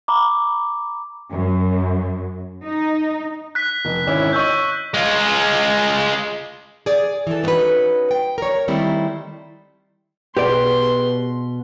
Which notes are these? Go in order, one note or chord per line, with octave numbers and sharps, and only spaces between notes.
A#5 B5 D6
F#2
D#4
F#6 B6
F1
G#1 C#4 E4
C#5 D#5 C#6 E6 G6
G#3 F4
G#4 D5
E3 A4
B3 C#4 D#4 F#4 B4
G5
A#4 C#5
D#3 G3 A3 C4 E4
B2 G4 G#4 B4 D5 C6